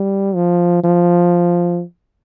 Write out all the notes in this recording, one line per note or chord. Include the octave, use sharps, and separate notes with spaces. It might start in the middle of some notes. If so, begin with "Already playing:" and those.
Already playing: G3
F3
F3